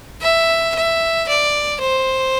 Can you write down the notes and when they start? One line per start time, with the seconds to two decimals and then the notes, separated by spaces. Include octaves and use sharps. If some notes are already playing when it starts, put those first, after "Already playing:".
0.22 E5
0.75 E5
1.28 D5
1.81 C5